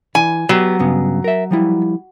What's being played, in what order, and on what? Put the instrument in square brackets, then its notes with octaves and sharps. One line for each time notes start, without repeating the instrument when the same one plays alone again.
[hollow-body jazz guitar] E3 [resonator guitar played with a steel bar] G#5
[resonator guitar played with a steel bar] F#3 [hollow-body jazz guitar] B3 G4
[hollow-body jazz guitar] G2 C#3 B3
A#4 E5
F3 G3 E4